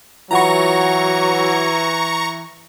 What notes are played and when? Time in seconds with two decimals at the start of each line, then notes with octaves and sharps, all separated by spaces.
0.31 E3 F#3 F4 F#5 A#5 B5 C#6